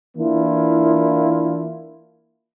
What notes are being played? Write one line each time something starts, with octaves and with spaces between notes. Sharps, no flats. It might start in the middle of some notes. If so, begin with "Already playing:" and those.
E3 A#3 D4 E4 F4